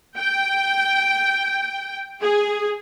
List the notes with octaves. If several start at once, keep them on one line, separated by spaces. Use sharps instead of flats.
G5
G#4